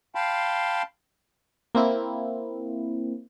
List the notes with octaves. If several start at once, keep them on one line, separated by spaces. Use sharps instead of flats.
F5 G5 A5 B5 C6
A#3 C4 E4